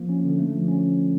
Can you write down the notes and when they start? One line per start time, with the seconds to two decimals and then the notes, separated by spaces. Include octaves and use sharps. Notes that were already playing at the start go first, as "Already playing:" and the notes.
Already playing: F3 A#3
0.09 C#4
0.24 D3
0.39 A3
0.54 F3
0.68 C#4